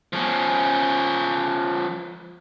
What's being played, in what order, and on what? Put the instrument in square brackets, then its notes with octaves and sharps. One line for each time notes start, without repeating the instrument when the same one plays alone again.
[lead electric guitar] F3 C#4